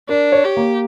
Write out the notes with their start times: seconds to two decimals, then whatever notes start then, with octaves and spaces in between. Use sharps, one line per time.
0.09 D4 A#4
0.32 C#5
0.44 G4
0.57 A#3